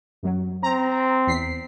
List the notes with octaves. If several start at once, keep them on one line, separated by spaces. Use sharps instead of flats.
F#2 F#3
C4 A#5
E2 B6 C7